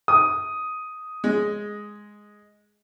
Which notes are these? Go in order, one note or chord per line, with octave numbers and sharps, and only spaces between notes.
D#6
G#3